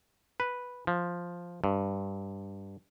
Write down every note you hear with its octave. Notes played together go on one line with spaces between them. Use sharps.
B4
F3
G2